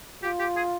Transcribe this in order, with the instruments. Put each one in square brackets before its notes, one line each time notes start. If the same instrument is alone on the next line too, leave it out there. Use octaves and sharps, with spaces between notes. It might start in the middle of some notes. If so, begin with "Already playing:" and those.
[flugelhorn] F4 [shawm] G4
[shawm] G4
G#4